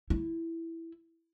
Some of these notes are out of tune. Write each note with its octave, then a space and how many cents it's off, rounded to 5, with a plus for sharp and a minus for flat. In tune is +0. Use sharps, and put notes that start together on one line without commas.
E4 +5